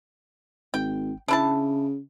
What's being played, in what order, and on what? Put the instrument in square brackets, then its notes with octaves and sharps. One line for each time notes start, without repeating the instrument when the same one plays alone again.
[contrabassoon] G#1 [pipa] G5
[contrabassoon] C#3 [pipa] D4 E4 A5